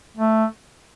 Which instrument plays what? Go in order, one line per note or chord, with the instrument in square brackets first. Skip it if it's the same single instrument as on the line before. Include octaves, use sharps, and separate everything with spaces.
[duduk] A3